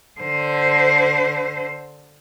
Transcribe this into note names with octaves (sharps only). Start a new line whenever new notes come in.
D3 C5